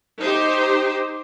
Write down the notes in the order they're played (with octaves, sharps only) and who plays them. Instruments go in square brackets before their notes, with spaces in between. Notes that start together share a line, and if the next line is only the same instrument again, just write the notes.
[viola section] D#4 G4 C5